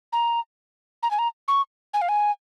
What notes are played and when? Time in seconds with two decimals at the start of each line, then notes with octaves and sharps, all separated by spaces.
0.13 A#5
1.03 A#5
1.11 G#5
1.19 A#5
1.48 C#6
1.94 G#5
2.02 F5
2.09 G#5